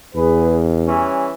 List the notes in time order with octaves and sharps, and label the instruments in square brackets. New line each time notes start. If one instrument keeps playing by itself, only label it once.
[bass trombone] E2 [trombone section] G#4 B4
[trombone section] E3 G3 C#4